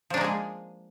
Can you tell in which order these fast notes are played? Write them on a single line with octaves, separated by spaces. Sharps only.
F3 D4 A#3 G#3 G#4